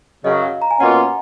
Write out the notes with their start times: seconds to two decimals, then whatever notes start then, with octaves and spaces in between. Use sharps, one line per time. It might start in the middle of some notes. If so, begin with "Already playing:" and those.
0.24 F#2 C#3 F#3 D#5
0.42 F5
0.62 A#5
0.71 G#5
0.80 B2 A#3 C#4 F4 F#5